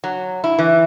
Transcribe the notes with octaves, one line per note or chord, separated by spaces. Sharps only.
F#3
E4
E3